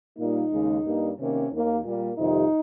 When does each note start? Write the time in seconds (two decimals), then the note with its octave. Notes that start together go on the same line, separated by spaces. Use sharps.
0.18 A#2 G3 A#3 D#4
0.52 D#2 C#3 G#3
0.84 G2 G3 A#3
1.18 C3 D#3 A#3 C#4
1.51 D#2 D#3 A#3
1.84 A#2 G3 A#3
2.17 F2 C3 D#3 G3 D#4